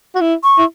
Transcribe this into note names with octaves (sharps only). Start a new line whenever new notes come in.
F#4
E4
C#6
E4